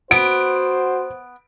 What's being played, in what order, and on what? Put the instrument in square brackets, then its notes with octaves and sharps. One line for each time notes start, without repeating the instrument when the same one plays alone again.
[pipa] B3 [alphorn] F#4 [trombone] C5 [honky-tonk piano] D7